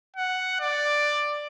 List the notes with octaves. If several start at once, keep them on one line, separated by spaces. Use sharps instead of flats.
F#5
D5